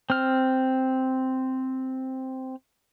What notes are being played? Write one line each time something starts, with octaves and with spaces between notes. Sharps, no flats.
C4 F6